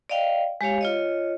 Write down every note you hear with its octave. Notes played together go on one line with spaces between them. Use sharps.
D5 D#5 F5 G5
G#3 G4 C#5 F5
F4 C#5 D#5